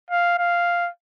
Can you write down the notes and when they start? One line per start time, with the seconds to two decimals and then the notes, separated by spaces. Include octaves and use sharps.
0.11 F5
0.38 F5